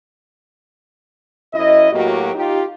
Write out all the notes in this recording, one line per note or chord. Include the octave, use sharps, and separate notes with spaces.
F#2 E4 D#5
A2 F#3 A#3 F#4 G4
D#4 F4 G4